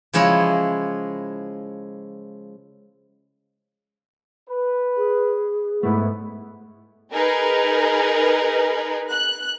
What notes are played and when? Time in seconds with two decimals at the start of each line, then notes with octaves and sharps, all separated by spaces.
0.13 C#3 F3 G#3 E4 C#5
4.49 B4
4.97 G#4
5.83 G#2 A3 B3 E4
7.13 D#4 G#4 A#4 B4
9.10 F#6